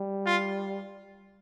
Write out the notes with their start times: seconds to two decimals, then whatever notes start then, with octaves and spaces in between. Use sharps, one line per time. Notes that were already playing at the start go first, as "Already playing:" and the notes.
Already playing: G3
0.26 F4